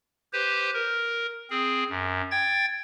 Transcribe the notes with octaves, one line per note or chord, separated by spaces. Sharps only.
G4 B4 C5
A#4
C4 G#4
F#2
G5 G#6 A6